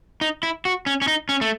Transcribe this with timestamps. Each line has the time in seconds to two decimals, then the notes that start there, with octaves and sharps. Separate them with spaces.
0.21 D#4
0.43 E4
0.65 F#4
0.86 C#4
1.02 C#4
1.08 D#4
1.29 C#4
1.41 A3